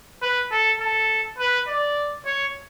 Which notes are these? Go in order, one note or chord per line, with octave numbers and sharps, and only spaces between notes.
B4
A4
A4
B4
D5
C#5